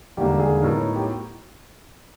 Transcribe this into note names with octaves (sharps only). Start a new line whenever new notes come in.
E1 D#2 D3 G3 A#3 G4
G#4
A2 F#3 B3 D#4 A#4
G4